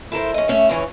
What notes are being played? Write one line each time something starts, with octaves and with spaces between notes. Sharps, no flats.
E4 A4 A#4 C5
C#4 D#5
A3 C#4 E5
C#3 E3 C#4 C#5